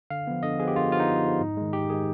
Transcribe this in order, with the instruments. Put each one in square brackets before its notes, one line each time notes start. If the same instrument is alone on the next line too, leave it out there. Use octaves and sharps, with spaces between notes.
[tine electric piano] D3 F5
F3 B3
D3 D#5
F3 G#4
B3
G4
D3 F4
F3 B3 F4
D#4
D3
F3 B3
G#2
D#3 G#3
G#2 G4
D#3 G#3 G#4